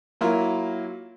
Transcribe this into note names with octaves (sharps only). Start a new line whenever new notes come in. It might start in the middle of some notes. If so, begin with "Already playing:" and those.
F#3 A#3 E4 F4